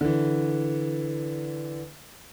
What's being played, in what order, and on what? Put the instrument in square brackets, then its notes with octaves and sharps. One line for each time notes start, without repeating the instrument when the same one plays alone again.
[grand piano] D3 E3